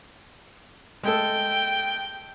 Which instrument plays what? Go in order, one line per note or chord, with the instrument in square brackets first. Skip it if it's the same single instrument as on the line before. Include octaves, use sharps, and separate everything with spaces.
[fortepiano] G#3 A3 A4 [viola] G5